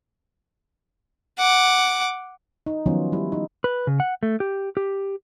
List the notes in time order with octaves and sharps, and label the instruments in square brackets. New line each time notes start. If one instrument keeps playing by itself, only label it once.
[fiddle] F#5 D6
[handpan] D#4
D#3 F3 F#3 B3 C#4 F4
G3 E4
D#4
[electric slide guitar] B4
C#3
F#5
A3
G4
G4